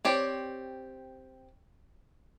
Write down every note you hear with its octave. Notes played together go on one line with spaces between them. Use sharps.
C4 G4 C#5 D5